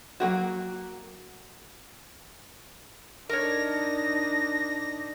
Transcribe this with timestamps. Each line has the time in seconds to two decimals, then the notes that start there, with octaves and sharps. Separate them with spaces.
0.20 F#3 A#3 F#4
3.29 D4 D#4 A#4 C#5 A#6